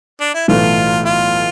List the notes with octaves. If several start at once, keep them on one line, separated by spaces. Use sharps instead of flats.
D4
E4
B1 A2 E3 A3 F4
F4